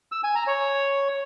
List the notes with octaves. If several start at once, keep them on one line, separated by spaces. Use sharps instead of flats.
E6
G#5
A#5
C#5